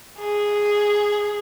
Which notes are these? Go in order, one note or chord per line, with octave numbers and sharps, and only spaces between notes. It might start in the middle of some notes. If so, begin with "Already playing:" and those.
G#4